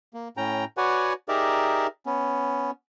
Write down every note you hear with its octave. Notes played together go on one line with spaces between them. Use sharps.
A#3
A2 C#4 G5 A#5
F#4 B4 C#5 D5 F#5 G#5
D#4 G4 G#4 A#4 D5 E5
B3 C#4